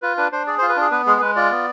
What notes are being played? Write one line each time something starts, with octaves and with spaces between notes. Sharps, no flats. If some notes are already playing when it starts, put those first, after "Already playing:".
F4 B4
D4 B4
D4 C5
G#4 D5
C5
F4
B4
D4 G#4
B3 B4
G#3 G#4
G#4
G#3 B4
F4 D5
B3